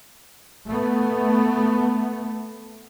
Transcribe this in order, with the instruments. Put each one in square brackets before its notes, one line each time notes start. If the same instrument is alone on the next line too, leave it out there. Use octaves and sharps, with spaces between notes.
[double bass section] A3 B3